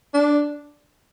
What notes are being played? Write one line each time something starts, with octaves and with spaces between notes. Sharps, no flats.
D4